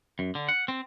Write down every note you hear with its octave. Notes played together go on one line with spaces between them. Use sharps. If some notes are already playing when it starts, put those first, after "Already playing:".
F#2
D3
F#5
C4